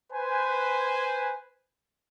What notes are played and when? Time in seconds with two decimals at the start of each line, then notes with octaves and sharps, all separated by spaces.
0.12 B4 C5 G#5